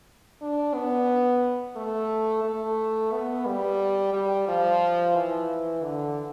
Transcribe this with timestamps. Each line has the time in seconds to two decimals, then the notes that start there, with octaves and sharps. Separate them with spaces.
0.42 D4
0.74 B3
1.76 A3
2.44 A3
3.12 B3
3.47 G3
4.14 G3
4.48 F3
5.16 E3
5.83 D3